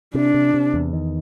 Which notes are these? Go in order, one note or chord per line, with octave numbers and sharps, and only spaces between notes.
C3 D4
C3
C3
E2
D#3